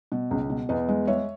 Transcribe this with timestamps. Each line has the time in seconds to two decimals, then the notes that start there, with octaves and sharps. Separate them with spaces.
0.12 B2
0.31 C#2
0.50 B2
0.69 E2 B4 D#5
0.89 G#3
1.07 G#3 C#5 E5